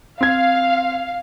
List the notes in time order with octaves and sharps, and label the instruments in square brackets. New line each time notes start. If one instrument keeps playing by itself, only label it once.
[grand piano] C4 G#6 [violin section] F5